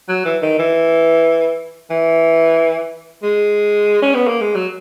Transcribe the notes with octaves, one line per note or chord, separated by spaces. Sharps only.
F#3
E3
D#3
E3
E3
G#3
C#4
B3
A#3
G#3
F#3